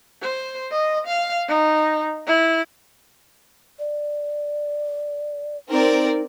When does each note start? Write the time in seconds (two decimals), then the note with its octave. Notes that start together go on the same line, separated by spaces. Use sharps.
0.22 C5
0.71 D#5
1.07 F5
1.48 D#4
2.27 E4
3.79 D5
5.70 C4 D#4 A#4 D5